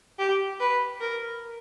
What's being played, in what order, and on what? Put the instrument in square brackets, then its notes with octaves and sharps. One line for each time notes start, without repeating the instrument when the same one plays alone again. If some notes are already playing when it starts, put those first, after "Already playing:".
[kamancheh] G4
B4
A#4